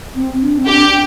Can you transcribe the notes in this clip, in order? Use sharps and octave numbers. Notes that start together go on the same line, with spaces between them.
C4
D4
C4
D4 G4